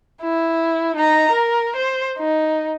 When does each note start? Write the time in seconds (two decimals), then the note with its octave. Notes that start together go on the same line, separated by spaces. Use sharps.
0.22 E4
0.95 D#4 A#5
1.31 A#4
1.76 C5
2.18 D#4